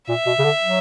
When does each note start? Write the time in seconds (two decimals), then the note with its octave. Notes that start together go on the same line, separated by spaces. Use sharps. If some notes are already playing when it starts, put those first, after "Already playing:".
0.09 A#2 E5
0.26 B2
0.39 C#3
0.44 D3
0.63 F#3